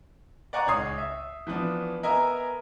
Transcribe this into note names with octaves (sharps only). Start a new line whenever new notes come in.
D5 D#5 F#5 G#5 A#5 C#6
C#2 D#4 C#5 D#6 C7
E5
E3 F3 B3 D4
B3 A#4 D#5 E5 G#5 A#5